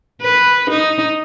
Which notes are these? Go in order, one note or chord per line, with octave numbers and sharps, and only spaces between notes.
B4
D#4